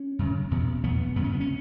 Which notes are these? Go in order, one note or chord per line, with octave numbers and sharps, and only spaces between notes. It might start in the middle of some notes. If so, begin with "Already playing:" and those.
Already playing: C#4
F#2 C#3
E2 B2
E2 B2 B3
F#2 C#3 B3 C#4
B3
C#4